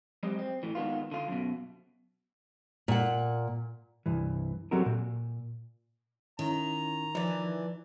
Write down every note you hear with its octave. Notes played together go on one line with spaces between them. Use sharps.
F#3 G#3 C4 G4 D#5
C4
A2 E3
D#3 G#3 B3 F4
D3 F4
F#2 B2
A#2 F#5
C2 G2 E3
F#3 G3 C4 F#4 A4 A#4
A#2
D#3 C#4 E4 A#5
E3 F3 D4